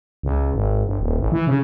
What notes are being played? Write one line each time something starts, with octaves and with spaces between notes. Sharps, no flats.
C#2
G#1
G1
D#1
A1
E3
C#3